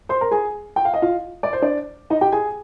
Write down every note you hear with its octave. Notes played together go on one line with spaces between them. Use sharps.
C5 C6
A#4 A#5
G#4 G#5
G5
F5
D#5
F4 F5
D5
C5
D4 D5
D#4 D#5
G4 G5
G#4 G#5